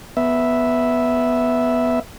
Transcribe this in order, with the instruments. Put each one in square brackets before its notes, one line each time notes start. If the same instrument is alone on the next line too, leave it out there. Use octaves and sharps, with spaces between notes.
[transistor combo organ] B3 E5